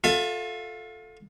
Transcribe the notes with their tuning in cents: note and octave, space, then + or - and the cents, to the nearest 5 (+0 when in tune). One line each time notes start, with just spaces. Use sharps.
F4 +35 A4 +0 E5 +30